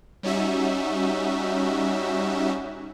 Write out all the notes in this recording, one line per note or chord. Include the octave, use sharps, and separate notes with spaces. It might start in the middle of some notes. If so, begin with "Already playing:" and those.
G3 C#4 D#4 F#4 E5